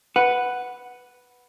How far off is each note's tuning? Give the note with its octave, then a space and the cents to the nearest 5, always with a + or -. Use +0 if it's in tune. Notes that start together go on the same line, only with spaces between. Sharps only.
B4 +0 F#5 +0